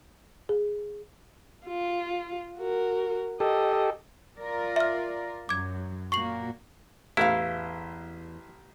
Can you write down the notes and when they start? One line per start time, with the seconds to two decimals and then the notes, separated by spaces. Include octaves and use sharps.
0.49 G#4
1.66 F4
2.58 F#4 A#4
3.40 G4 A4 D#5
4.38 F4 A#4 D5
4.76 E5 F6
5.49 F#2 F#3 D6 G#6
6.12 A#2 A#3 F#4 C#6 C7 F#7
7.17 A1 E2 E4 A4 F5